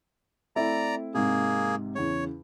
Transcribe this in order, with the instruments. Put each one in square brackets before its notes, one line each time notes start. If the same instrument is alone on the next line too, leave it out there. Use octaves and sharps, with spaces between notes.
[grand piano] A3 C4 E4 [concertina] D5 A#5
[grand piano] G#2 C3 [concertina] A#3 G#4
[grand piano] E2 C#3 [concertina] C#5